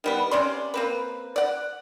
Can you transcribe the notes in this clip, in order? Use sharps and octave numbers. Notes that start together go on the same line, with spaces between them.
D#3 G3 B3
C3 C#4 D5 C6
A#3 C4 B4
D5 F#5